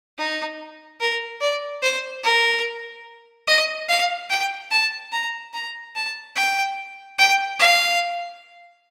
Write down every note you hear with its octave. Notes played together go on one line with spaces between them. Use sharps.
D#4
A#4
D5
C5
A#4
D#5
F5
G5
A5
A#5
A#5
A5
G5
G5
F5